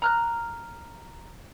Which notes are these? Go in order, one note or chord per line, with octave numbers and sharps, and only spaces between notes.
A#5 F6 F#6